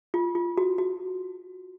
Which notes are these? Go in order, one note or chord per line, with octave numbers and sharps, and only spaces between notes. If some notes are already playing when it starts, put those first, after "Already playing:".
F4
F4
F#4
F#4